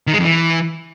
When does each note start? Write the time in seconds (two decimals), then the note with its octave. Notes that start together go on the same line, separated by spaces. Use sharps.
0.07 D#3
0.13 G#3
0.19 F2
0.25 E3